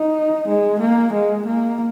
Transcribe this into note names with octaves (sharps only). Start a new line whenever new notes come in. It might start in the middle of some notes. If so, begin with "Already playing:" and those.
Already playing: D#4
G#3
A#3
G#3
A#3